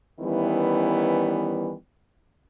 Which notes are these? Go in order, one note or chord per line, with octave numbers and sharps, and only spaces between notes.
D#3 E3 G3 B3 C#4 E4